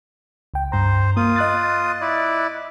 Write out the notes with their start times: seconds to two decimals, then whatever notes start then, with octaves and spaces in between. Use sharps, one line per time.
0.54 C#2 G5
0.72 G2 C5 A#5
1.17 A#3 F4 D#6
1.36 D#5 F#6 A6
2.01 E4 D5